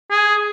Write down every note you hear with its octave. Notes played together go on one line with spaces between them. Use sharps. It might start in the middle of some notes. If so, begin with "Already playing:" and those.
G#4